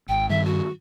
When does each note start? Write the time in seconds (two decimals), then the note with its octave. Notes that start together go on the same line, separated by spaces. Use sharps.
0.09 G#1 G5
0.29 G2 D#3 E5
0.45 F#4